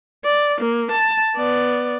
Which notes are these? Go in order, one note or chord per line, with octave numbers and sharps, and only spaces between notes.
D5
A#3
A5
B3 D5